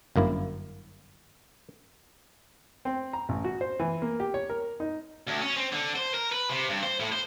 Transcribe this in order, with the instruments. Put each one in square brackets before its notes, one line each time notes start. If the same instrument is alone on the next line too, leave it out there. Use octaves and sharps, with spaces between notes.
[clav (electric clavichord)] G1 F#2 A#3 E4
[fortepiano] C4
A#5
A1
F#4
C5
E3
A#3
G4
C#5
A#4
D#4
[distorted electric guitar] D2
C#4
C4
D3
C5
A#4
B4
C3
G2
C5
A2
C5